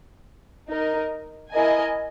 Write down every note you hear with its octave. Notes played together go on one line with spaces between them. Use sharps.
D#4 A#4 D#5
E4 A#4 D#5 G#5